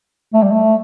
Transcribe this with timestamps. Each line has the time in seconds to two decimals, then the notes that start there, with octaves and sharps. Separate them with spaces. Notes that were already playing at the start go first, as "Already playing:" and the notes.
0.34 A3
0.43 G3
0.52 A3